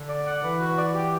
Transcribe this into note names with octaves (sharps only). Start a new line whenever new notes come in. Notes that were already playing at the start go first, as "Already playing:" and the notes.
Already playing: D3
D5
F#5
E3 B4
F#4
D5
G4